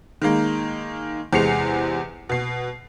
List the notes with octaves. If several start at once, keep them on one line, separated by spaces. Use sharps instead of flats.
D#3 G#3 A#3
E2 C3 G#3 C7 C#7 F7
B2 C7